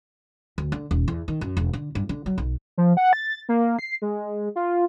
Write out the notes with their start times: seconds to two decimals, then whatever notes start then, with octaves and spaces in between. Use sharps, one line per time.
0.58 D2
0.72 D3
0.91 D#1
1.08 E2
1.28 D#3
1.41 F#2
1.57 E1
1.73 D3
1.95 G2
2.09 D3
2.26 F#3
2.38 B1
2.78 F3
2.97 F#5
3.13 A6
3.49 A#3
3.79 C7
4.02 G#3
4.56 F4